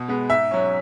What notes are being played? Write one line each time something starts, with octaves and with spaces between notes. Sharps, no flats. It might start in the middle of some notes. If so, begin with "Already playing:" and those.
Already playing: B2
G#3 B3
G#2 E5
F#3 C#4